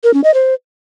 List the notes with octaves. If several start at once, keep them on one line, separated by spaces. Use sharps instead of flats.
A#4
C#4
D#5
C5